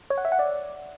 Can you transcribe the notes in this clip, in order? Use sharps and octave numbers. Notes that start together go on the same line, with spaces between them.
C#5
F#5
E5
F#5
D5